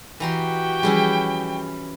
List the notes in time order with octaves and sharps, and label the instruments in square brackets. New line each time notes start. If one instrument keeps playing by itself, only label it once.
[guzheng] E3 A#5 C6 [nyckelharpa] F#4 G4 [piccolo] G5
[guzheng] E3 C#4 E4 [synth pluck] F3 G3 G#4